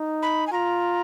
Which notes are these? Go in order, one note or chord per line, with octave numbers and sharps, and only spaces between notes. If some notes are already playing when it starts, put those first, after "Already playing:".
Already playing: D#4
B5
G#5
F4 A#5